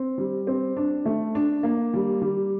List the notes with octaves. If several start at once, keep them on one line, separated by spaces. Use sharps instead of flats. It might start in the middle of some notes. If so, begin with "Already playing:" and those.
Already playing: C4
G3
C4
D4
A3
D4
A#3
G3
G3